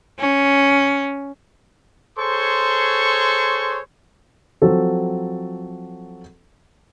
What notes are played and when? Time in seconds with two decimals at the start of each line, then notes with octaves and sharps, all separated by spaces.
0.20 C#4
2.18 G#4 A4 C5 C#5 C6 C#6
4.62 F3 F#3 C4 F#4 A4